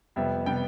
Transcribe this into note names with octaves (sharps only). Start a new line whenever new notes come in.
F2 C3 G3 B3 E5
C3 G3 B3 G5